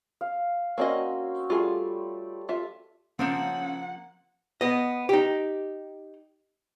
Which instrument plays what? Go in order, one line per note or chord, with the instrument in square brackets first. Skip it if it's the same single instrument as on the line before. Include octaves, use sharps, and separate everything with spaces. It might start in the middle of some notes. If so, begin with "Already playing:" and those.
[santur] F5
[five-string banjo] A#3 D5 D#5 [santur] C4 C#4 F#4
[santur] G3 A3 D5 [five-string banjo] F4 G#4
[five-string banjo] F4 E5
[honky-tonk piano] C#3 [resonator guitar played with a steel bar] F3 A#3 C4 [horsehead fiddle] F#5
[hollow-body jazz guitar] B3 D#5
D#4 G4